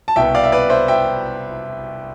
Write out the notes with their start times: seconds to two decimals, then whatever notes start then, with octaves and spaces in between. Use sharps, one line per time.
0.08 A5
0.16 C2 B2 B3 E5 G5
0.35 D5 F5
0.44 E5
0.52 B4 D5
0.70 C5 E5
0.88 E5 G5